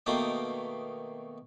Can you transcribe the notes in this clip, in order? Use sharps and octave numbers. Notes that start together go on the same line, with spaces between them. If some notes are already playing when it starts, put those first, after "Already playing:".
B2 D#3 A3 A#3 G5 D#6